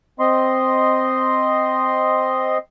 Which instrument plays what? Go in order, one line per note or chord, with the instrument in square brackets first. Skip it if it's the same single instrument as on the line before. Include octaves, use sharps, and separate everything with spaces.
[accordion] C4 D#5 C6